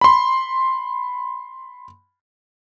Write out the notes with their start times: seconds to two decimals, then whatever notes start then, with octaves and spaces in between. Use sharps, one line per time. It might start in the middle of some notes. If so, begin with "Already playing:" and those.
0.01 B5 C6